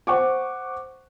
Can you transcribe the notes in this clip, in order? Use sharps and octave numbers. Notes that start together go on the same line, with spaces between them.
C5 F#5 C#6 D6